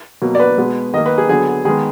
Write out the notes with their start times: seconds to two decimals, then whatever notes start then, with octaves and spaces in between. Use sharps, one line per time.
0.22 B2 F#3 A#3
0.35 D5
0.40 B4
0.58 B2 G#3 B3
0.94 D#3 A#3 D#5
1.06 B4
1.18 G#4
1.29 D3 F#3 B3 G#4
1.65 D#3 G#3 B3 G#4